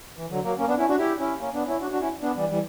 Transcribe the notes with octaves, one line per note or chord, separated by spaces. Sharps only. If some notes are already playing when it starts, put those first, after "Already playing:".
E3
D3 F#3
F#3 A#3
A#3 C#4
B3 D4
C#4 E4
D4 F#4
E4 G4
C#4 E4
A#3 C#4
B3 D4
C#4 E4
D4 F#4
D4 F#4
C#4 E4
B3 D4
E3 G3
E3 G3